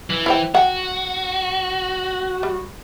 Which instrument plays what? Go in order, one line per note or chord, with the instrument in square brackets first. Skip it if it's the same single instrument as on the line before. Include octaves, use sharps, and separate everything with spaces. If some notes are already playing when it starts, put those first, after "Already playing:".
[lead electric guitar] E3
[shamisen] E4 C5 G5
[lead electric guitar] F#4 [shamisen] F#5 G5
[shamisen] G3